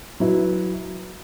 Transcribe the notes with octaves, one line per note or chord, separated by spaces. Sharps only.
F#3 E4 B4